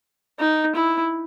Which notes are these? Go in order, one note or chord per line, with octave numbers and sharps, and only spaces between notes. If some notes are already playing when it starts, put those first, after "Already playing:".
D#4
E4